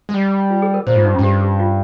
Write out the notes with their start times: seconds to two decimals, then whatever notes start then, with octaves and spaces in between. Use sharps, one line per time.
0.09 G#3
0.14 G3
0.50 F4
0.62 G#4
0.74 A#4
0.86 A#2 C5
0.95 G#2 F4
1.05 G2 D#4
1.14 F2 C#4
1.19 G#2
1.23 G2 G4
1.41 G4
1.60 F4